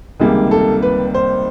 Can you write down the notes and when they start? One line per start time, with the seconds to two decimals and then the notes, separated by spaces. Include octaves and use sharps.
0.19 C#2 C3 D#3 G3 A#3 G#4
0.51 A4
0.82 B4
1.14 C5